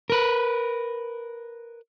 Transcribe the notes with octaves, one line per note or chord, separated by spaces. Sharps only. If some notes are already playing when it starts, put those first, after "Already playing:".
A#4 B4